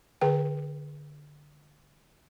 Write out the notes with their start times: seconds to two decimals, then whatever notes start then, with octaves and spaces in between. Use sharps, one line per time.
0.21 D3 G#4 B4 G5